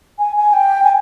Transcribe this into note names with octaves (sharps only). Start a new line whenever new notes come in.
G#5
G#5
G5
G#5